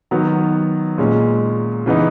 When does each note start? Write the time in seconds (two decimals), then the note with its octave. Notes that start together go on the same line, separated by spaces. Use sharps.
0.11 D#3 F#3 B3
0.98 A#2 G#3 C#4
1.86 C#3 E3 B3 D#4